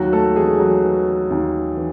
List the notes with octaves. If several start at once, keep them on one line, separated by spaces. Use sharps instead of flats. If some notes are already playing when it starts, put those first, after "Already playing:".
Already playing: D#2 F#3 F#4
A3 A4
E3 G#3 G#4
F#3 F#4
E3
D#2
E3